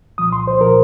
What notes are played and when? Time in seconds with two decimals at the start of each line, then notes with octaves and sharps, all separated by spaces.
0.18 C2 A#2 F3 D#6
0.32 C6
0.47 C5
0.61 A#2 F3 A#4